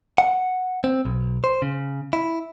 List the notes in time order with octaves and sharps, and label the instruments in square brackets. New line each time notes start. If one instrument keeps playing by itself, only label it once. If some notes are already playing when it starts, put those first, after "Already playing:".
[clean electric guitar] F#5
C4
B1
C5
C#3
E4